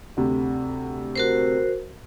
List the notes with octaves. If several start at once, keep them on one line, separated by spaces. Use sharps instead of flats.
D2 C3
F#4 A#4 C5